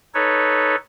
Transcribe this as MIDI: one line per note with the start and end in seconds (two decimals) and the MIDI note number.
0.14 0.76 63
0.14 0.76 69
0.14 0.76 71
0.14 0.76 73